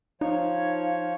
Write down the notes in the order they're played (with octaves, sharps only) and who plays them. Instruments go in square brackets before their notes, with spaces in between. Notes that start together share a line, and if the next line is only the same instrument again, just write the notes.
[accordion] F3 C#5 [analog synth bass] D#4 [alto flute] F5